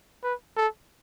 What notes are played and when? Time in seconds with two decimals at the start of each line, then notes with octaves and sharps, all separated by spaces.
0.23 B4
0.57 A4